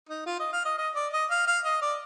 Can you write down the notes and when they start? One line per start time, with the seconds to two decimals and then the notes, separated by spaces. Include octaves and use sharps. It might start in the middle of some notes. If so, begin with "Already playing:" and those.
0.09 D#4
0.26 F4
0.40 D#5
0.53 F5
0.65 D#5
0.78 D#5
0.95 D5
1.13 D#5
1.30 F5
1.47 F5
1.65 D#5
1.82 D5